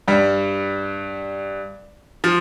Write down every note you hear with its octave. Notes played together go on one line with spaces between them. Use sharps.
G2 G3
F3